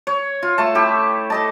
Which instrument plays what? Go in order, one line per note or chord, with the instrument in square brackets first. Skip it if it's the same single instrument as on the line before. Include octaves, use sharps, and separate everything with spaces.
[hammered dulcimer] C#5
F4
A3 A5
E4 G4
A4 D#5 A5